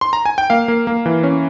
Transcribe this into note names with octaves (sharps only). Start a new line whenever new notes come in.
C6
A#5
G#5
G5
A#3 F5
A#3
A#3
E3
C#4